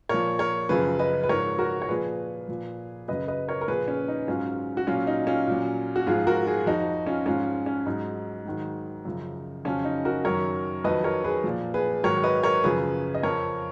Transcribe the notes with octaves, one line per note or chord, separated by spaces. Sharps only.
A#2 F3 A#4 C#5
A#4 C#5
F#2 C#3 F3 G#4 B4
B4 D#5
B4
G#2 F3 A#4 C#5
F#4 A#4
C#5
A#2 F3 G#4 B4
A#2 F3
F#2 C#3 F#3 B4 D#5
B4 D#5
A#4 C#5
A#4
A#2 F3 G#4 B4
C#4
D#4
G#2 F#3 C#4 F4
F#4
A#2 F#3 C#4 F4
D#4
C#4 F4
A#2 F#3
F#4
G#2 F3 F4 G#4
F#4 A#4
F4 G#4
F2 F3 D#4 F#4
C#4 F4
G#2 F3 C#4 F4
C#4
G#2 F#3 D#4
G#2 D#3 F#3
F#2 C#3 F3
F2 C#3 F#3 C#4 F4
D#4
F#4 A#4
F#2 D#3 F#3 A#4 C#5
F2 D#3 F#3 B4 D#5
A#4 C#5
G#4 B4
A#2 F3
G#4 B4
G#2 D#3 F#3 A#4 C#5
B4 D#5
A#4 C#5
F#2 C#3 F3 G#4 B4
D#5
F2 F3 A#4 C#5